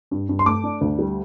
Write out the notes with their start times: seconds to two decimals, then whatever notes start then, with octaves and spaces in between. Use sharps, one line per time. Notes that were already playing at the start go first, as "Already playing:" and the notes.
0.11 G2
0.29 G2
0.39 C6
0.46 A3 D6
0.63 D4
0.81 D2
0.99 G3